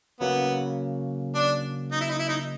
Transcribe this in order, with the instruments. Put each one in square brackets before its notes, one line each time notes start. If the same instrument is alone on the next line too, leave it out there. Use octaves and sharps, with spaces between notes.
[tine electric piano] C#3 F#3 A#3 [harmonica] B3
[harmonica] D4
D#4
E4
D#4
E4
D#4